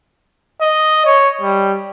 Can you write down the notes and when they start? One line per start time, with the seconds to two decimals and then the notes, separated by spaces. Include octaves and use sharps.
0.61 D#5
1.06 C#5
1.41 G3